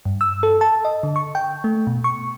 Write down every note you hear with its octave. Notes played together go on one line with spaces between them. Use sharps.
G2
E6
A4
A5
D#5
D3
C#6
G5
A3
B2
C#6